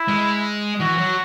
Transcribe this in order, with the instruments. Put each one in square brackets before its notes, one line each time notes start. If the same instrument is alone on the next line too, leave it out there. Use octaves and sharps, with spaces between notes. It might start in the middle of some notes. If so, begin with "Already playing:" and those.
Already playing: [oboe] E4
[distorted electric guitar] G#3
[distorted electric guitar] E3 [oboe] F#4
[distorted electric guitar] F#3